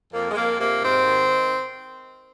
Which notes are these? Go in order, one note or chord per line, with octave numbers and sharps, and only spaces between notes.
F2 A#3
G#3
F2 A#3
C3 A#3
G#2 C4
D#3
D#3